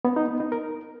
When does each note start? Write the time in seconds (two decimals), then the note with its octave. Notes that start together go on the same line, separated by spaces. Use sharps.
0.05 B3
0.16 D#4
0.28 B3
0.40 D#4
0.52 A#4